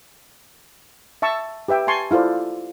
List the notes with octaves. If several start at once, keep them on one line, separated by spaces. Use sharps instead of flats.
E5 A5 C#6 E6
G4 B4 E5 G5
G#5 A5 C6 C#6
E4 F4 A4 C5 D5